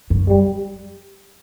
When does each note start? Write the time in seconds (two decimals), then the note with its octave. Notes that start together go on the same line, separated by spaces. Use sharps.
0.10 F#2
0.29 G3